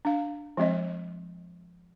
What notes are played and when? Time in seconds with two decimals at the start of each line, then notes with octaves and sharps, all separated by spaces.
0.05 D4 F5
0.57 F3 G#3 C4 D#5